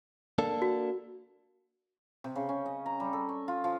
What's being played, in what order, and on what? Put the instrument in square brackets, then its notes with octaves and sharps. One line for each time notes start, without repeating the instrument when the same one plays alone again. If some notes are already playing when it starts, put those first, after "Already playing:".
[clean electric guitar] A#3 D4 A4
[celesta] F#4
[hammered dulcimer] C3
C#3
C#4
D#5
A#5
G3
A4
C#6
F4
F3